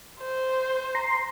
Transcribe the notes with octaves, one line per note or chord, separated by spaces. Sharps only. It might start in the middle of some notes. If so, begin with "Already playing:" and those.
C5
A#5 C6